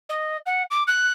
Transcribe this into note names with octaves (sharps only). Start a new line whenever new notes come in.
D#5
F#5
D6
F#6